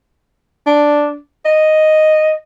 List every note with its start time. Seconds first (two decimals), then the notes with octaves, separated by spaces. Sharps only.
0.66 D4
1.45 D#5